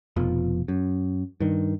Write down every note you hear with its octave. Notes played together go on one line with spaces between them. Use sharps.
F1 F2 B2 F3
F#2
G2 D#3